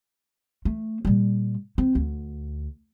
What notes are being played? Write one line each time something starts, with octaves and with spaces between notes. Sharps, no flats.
A3
A#2 G3
C4
D2